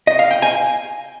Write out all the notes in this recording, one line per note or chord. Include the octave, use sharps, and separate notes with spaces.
D#5
F5
G5
G#5